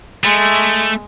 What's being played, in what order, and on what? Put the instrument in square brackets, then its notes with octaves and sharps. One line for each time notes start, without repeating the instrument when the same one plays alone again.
[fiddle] G#3 [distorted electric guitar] A3